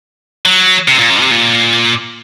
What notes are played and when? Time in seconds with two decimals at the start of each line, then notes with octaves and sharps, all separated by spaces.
0.45 F#3
0.88 C3
0.99 A#2
1.10 F#2
1.21 C3
1.31 A#2